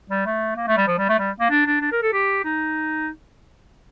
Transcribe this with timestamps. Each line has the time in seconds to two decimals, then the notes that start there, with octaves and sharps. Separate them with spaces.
0.10 G3
0.26 A3
0.56 A#3
0.67 A3
0.77 G3
0.87 F3
0.98 G3
1.09 A3
1.19 G3
1.40 A#3
1.50 D4
1.66 D4
1.81 D4
1.91 A#4
2.02 A4
2.13 G4
2.44 D#4